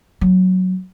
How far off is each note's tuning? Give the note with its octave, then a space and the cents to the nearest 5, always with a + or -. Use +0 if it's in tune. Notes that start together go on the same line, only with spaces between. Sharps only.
F#3 +0 A#3 +0